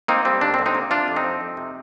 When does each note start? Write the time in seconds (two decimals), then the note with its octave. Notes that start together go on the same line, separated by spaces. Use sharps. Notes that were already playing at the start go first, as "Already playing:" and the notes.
0.08 A#3 C4 D#4
0.25 G3 C4
0.41 D#2 D4
0.54 C4
0.59 D3
0.66 C4 D#4
0.75 A#3
0.91 C3 D4 F4
1.08 F2
1.16 C4 D#4
1.24 F3
1.41 F2
1.57 C3